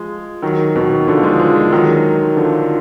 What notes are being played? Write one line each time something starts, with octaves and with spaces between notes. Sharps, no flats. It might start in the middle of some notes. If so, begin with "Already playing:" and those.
Already playing: F3 G#3
D#3 F#3
B2 D#3
D3 F3
F3 G#3
F3 G#3
F3 G#3
D#3 F#3
D3 F3